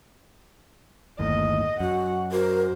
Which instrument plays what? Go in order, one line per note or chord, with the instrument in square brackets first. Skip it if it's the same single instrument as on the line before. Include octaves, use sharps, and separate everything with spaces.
[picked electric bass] G1 D#2 A2 [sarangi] D#5
[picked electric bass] F#2 [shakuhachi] F#4 [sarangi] F#5
[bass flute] F#4 [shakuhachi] A#4 [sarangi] C5